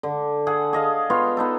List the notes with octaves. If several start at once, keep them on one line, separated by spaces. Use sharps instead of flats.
D3
G#4 A4 F#5
G#4 D#5 F5
B3 F4 C#5
B3 D#4 A4